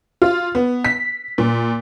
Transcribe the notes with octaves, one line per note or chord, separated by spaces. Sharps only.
F4
B3
B6
A#2